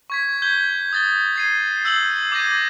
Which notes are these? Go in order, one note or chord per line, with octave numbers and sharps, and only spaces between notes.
C#6 G#6 B6
G6 G#6 G7
D#6 A6 G7
G#6 C7 D#7
E6 G6 C7 F#7 G7
D6 G6 G#6 A#6 D#7